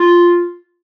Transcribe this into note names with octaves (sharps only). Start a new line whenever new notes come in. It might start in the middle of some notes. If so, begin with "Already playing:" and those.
Already playing: F4